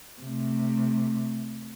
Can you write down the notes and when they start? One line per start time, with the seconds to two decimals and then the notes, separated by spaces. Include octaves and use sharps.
0.22 C3 A3